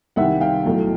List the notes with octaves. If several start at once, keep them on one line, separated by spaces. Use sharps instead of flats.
C2 C3 D#3 G3 E5 F#5
F5 G5
B1 A2 F#3 A3